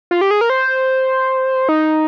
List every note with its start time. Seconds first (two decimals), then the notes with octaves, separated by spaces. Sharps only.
0.11 F4
0.21 G4
0.31 G#4
0.41 A#4
0.50 C5
1.69 D#4